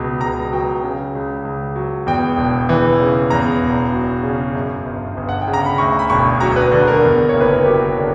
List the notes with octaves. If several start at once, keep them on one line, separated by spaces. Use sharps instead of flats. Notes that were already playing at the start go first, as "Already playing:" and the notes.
Already playing: C#2 B2
C#2 A#5
F#3 G5
C#3
C#2
C#2
F#3
E2 G5
E1
E3
C#3
E2 A#5
E1
F#3
C#3
F#2
G1
G1
F#5
G5
C#3
A#5
B5
D2 C#6
B5
E1 C#6
F#3 A#5
B4
D3
A#4
E2
F#1 C#5
B4
A#4
F#3 G4
D3